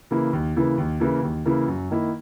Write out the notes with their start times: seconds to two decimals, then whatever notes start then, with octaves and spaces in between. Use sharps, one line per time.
0.11 C#3 E3 A#3 E4
0.33 D#2
0.56 C#3 E3 A#3 E4
0.78 D#2
1.00 C#3 E3 A#3 E4
1.22 D#2
1.46 C#3 E3 A#3 E4
1.68 F#2
1.90 D#3 A#3 E4